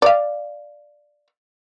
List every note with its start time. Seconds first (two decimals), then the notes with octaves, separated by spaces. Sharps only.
0.02 D5 F5